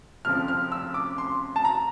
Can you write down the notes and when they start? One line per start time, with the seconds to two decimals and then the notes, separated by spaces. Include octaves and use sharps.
0.25 F1 F2 C#3 F3 F6
0.48 F6
0.72 E6
0.94 D6
1.18 C6
1.56 A5
1.65 A#5